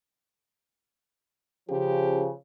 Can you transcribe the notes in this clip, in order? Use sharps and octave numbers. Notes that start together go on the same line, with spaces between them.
C#3 F3 G4